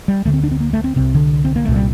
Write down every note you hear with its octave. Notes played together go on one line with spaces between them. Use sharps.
G3
D2 D3 A3
C4
D4
C4
A#3
A3
C4
C2 C3 C4
D3
C4
A#3
C2 A#2 A3
G3